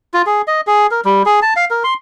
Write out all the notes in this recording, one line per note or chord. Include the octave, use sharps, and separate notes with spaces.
F4
G#4
D#5
G#4
A#4
G3
G#4
A5
F5
A#4
C6